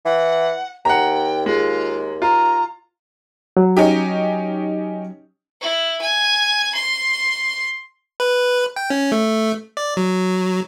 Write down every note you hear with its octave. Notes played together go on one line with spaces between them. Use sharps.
E3 F#5
D#2 F#5 G5 A#5
G#3 F4
F4 A#5
F#3
C#4 D#4 G4
E4
G#5
C6
B4
G5
C#4
A3
D5
F#3